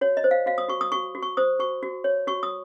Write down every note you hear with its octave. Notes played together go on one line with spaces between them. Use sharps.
F#4 C#5
D#5
C5
F5
F#4 F5
D#6
F#4 C#6
D#6
F#4 C#6
F#4
C#6
C5 D#6
F#4 C#6
F#4
C#5
F#4 C#6
D#6